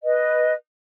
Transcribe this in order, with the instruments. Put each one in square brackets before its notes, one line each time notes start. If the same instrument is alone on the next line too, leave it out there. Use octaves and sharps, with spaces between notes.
[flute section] B4 D#5